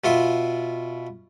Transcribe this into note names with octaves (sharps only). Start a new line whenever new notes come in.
B2 F4 E5 C6